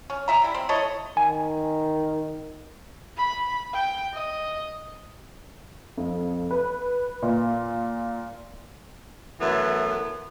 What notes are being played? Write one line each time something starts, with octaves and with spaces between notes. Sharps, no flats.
C#4
G#3 E5 A#5
G3 E4
C4
E4 A4 C#5 D#5
D#3 G#5
B5
G5
D#5
F2
B4
A#2
F#2 E3 A3 B3